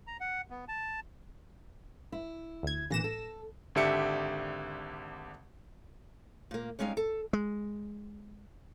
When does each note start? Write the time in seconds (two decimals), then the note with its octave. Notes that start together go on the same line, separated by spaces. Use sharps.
0.07 A#5
0.20 F#5
0.50 B3
0.68 A5
2.12 E4
2.63 D2 G#6
2.90 A1 A#2 D3 E3 A#6 E7
3.04 A4
3.75 G#1 D3 G4 E5 C#7
6.51 A#2 A#3
6.79 G3 G#3 C#4 D#4 F5
6.97 A4
7.33 G#3